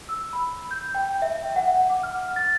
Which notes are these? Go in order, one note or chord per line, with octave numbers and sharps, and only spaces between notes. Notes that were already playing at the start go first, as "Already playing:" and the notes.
E6
B5
G6
G5
E5
F#5
D6
F6
A6